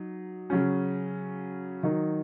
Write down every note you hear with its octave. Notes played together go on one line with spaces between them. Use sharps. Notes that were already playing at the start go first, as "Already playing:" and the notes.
Already playing: F#3 D#4
C#3 F#3 C#4
D#3 F#3 D#4